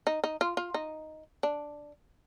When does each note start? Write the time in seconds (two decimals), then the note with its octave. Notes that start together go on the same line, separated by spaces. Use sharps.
0.07 D#4
0.24 D#4
0.41 F4
0.57 F4
0.74 D#4
1.43 D4